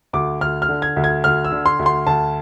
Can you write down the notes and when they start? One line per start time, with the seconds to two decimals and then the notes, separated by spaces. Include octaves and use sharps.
0.13 D2 D6
0.41 D2 F6
0.62 F6
0.69 D3
0.82 G#6
0.96 D2
1.04 G#6
1.24 D2 F6
1.44 E6
1.52 D3
1.66 C6
1.79 D2
1.86 C6
2.07 D2 A5